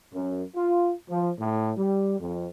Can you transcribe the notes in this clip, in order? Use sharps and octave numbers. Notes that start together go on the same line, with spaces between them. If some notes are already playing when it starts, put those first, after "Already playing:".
F#2
F4
F3
A2
G3
F2